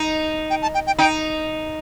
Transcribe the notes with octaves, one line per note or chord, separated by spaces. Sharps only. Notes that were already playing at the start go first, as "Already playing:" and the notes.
Already playing: D#4
G5
A5
G5
G5
D#4 G5